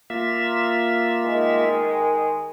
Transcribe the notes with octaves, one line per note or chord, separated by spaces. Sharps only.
A#3 F4 E5
D#3 G#3